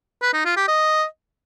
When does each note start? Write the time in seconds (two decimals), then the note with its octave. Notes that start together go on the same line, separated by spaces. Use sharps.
0.22 B4
0.33 D#4
0.45 F4
0.57 G4
0.68 D#5